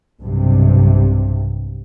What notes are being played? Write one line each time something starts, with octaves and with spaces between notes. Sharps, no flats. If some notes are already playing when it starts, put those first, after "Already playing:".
B1 G2 C3